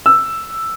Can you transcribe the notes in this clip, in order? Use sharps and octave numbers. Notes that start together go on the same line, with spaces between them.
E6